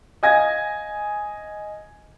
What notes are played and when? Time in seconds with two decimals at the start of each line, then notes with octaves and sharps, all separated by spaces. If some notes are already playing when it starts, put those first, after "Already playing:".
0.23 D#5 F5 G#5 G#6 A#6